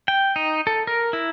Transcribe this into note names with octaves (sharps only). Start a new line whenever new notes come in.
G5
D#4
A4
A#4
E4